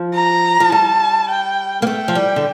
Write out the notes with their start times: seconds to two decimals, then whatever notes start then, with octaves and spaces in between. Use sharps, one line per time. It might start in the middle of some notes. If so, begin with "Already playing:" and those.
Already playing: F3
0.15 A#5
0.60 F3
0.72 G3 A5
1.30 G5
1.82 A#3
1.86 A3 G5
2.08 F3
2.15 G3
2.36 D3